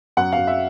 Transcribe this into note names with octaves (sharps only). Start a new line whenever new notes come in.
F#2 F#5
F#2 F5
E5